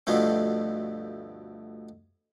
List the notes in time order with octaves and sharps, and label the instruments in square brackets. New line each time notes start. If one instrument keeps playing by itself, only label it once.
[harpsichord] D2 G2 B2 F3 A3 C4